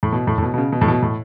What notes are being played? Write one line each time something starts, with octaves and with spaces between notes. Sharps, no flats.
A2
B2
A2
A2
B2
B2
C#3
B2
A2
B2
A2